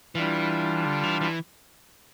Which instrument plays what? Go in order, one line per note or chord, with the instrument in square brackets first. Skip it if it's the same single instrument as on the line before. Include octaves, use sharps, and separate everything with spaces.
[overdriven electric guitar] E3 [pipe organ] G3 D4 F4
[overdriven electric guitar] D3
E3
E3